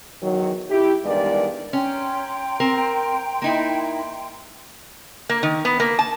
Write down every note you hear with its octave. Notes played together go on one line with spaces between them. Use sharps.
E2 D#3 F#3
E4 G4
E2 G2 D#3 G#3 D5
C#4 G5 A#5 C6
C4 A#4
A#3 D#4 E4
A#3
D#3
B3
A#3
A5